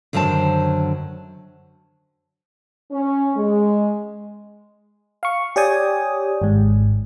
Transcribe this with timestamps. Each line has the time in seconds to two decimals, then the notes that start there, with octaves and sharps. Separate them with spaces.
0.13 F#2 D3 D#3 F#3 C5 A5
2.92 C#4
3.36 G#3
5.23 F5 C#6
5.56 G4 C#5 D5 G5 G#5 D#6
6.42 G#1 G#2